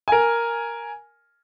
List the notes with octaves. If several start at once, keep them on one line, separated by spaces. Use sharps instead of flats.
A#4 G#5